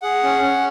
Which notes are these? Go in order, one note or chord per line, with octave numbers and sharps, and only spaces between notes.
G#4 F#5
C#4
C#4